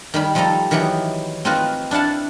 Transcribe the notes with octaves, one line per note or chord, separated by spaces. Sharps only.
D#3 G3 B5
F3 G3 A4 D#5 A#5
D#3 E3 F#3 B3 G4
C4 D#4 F4 F#4 B4
D4 E4 F5 F#5 A5